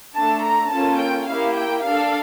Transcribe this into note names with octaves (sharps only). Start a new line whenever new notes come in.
A3 D4 A4 A5
A#5
A#3 C#4 F4 A4 A5
G5
A#3 E4 G4 F5
G5
D4 A4 F5